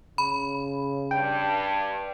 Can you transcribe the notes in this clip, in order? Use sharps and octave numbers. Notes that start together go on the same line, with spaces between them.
C#3 B5
G2 G5